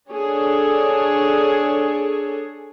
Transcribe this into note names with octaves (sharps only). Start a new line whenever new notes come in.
D4 G#4 A4 C#5